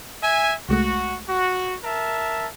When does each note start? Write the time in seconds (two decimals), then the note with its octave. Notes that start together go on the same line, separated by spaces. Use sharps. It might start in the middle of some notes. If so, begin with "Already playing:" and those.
0.22 E5 G#5
0.69 C2 G#3 A3 F#4
1.29 F#4
1.83 A#4 E5 A5